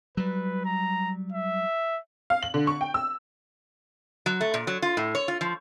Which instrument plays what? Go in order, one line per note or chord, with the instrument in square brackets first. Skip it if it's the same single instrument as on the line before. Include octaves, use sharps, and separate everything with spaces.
[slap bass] F#3 G3 [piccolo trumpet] B4
[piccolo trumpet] A#5
E5
[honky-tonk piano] F5
F#7
D3
C#6
G5
E6
[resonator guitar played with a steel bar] F#3
A3
A#2
F#3
F4
A2
C#5
F4
F3